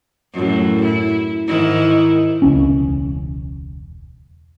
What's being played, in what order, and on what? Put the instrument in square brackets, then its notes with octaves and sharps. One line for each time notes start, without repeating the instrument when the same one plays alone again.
[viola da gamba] F#2 A2
E4
G#2 D#3 E4
[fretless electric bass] E1 C#2 C#4